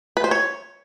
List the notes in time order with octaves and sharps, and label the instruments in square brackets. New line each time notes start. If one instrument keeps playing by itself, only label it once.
[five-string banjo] B4
C5
C#5